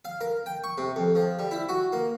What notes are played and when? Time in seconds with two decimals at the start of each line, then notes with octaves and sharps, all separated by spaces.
0.05 F5
0.21 A#4
0.46 G5
0.64 C#6
0.78 C3
0.96 F2
1.15 F3
1.39 G3
1.51 E4
1.69 F#4
1.93 A#3